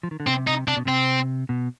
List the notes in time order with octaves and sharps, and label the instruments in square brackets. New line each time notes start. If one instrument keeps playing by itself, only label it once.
[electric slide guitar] F3
D#3
D3
[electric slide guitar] C3 [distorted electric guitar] C4
[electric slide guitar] C3 [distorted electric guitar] D#4
[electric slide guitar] C3 [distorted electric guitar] D4
[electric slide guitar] B2
[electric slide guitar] C3 [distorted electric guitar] C4
[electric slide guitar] B2